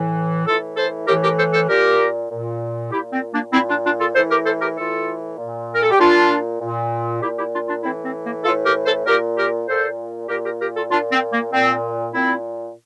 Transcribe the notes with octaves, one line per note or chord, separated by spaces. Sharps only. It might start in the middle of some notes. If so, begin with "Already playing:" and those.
Already playing: A2 E3
A2 E3 F4 A4
A4 C5
A2 E3 G4 A#4
G4 A#4
A4 C5
A4 C5
A#2 G4 A#4
A#2
A#2 E4 G4
C4
A#3 D4
A#2 C4 E4
D4 F4
D4 F4
F4 A4
A2 E3 A4 C5
G4 A#4
A4 C5
G4 A#4
A2 E3 F4 A4
A#2
A#4
A4
G4
A#2 D4 F4
A#2
A#2 E4 G4
E4 G4
D4 F4
D4 F4
A2 E3 C4 E4
C4
A#3
A2 E3 F4 A4
G4 A#4
A4 C5
A#2 G4 A#4
G4 A#4
A#2 A4 C5
A#2 G4 A#4
G4 A#4
G4 A#4
F4 A4
A#2 D4 F4
C4
A#3
A#2 C4
A#2 C4 E4